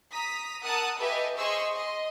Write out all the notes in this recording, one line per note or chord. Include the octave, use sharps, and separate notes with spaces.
A#5 D#6 B6
A#4 F#5 A5 D#6 E6 F#6
G4 A4 B4 D#5 E5 G#5
G#4 C5 D#5 C6 C#6 E6
D#5 C6